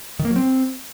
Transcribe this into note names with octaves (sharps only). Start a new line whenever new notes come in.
D#3
A#3
F#3
C4